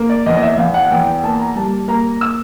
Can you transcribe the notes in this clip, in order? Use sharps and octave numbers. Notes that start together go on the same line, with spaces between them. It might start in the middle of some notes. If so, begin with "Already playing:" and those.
Already playing: A#3
D5
E2 D#5
D#5
E5
E2 F5
F#5
F#5
E2 G5
G5
A#3 A5
A#5
G3 A5
A#3 A#5
E6